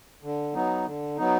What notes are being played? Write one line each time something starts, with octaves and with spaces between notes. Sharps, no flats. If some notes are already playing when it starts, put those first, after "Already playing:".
D3
F#3 B3 D#4
D3
F#3 B3 D#4